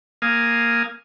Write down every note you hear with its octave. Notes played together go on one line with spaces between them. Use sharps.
A#3 F5 G#5 D#6